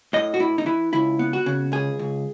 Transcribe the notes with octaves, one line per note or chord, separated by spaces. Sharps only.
A2 D#5
F#4
A2 E4
D#4
E3 E4
C#2 E4
B3
F#4
C#3
C#2 G#4
C#2